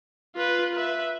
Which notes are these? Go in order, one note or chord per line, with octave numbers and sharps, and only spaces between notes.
F4 B4
B4 E5